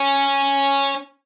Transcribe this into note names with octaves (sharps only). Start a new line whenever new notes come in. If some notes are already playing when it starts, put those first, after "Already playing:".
Already playing: C#4